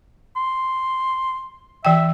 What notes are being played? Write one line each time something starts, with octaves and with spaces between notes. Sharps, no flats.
C6
E3 E5 G5